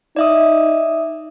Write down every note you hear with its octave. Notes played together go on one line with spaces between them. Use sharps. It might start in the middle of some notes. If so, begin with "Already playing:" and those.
D#4 D5 E5 D#6